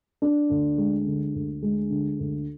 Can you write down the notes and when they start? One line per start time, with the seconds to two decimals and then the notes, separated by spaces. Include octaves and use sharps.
0.22 D4
0.50 D2
0.77 G#3
1.06 D3
1.34 D2
1.62 G#3
1.90 D3
2.19 D2